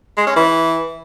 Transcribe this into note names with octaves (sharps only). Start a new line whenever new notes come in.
G#3
C#4
E3